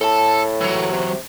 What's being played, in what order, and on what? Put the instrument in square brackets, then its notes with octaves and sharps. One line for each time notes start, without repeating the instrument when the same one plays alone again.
[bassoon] A2 [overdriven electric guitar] A4 A5
[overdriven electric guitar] E3 F#3
[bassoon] C3